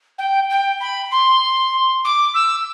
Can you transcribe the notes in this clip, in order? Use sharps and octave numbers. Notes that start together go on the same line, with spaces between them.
G5
G5
B5
C6
D6
E6